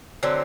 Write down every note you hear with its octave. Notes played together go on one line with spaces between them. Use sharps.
D3 F#3 C4